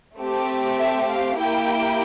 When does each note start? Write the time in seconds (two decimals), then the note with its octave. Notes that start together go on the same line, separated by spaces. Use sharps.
0.18 A3 C4 G4
0.79 E5
1.09 F5
1.39 A#3 E4 G4 G5